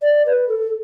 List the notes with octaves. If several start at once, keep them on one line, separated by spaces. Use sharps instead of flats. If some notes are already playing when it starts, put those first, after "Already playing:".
D5
B4
A4